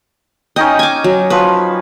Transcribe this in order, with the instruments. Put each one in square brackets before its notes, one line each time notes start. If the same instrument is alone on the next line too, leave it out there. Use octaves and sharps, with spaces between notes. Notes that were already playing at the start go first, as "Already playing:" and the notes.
[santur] C#4 D#4 G5 [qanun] D#5
[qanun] G#5 D6
F#3
[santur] F3 F#3 [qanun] B4